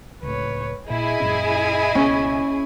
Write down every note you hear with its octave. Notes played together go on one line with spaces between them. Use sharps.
C#2 A2 B4 C#5
A#2 E4 G#4 D#5 G#5
F#2 A#2 C#4
C#2 B2 B3 C#4